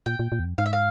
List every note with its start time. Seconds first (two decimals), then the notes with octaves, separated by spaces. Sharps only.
0.06 A#2 G5
0.19 A#2
0.32 A#2
0.39 E2
0.45 F2
0.58 G#2 F5
0.66 E5
0.73 F5